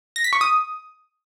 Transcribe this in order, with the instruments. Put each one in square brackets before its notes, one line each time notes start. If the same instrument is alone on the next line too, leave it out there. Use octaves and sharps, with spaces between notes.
[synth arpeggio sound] A#6
B6
C#6
D#6